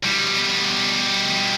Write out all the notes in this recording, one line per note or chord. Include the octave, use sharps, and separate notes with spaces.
B2 G3